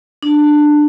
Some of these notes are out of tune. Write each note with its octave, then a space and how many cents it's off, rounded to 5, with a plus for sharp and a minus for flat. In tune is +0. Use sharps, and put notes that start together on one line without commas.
D4 +15